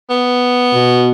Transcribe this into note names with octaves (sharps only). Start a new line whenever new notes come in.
B3
B2